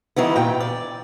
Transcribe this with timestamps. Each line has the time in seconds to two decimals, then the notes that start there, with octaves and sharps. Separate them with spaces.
0.16 D#3 E3 G3 B3
0.36 A#2 G5
0.60 D5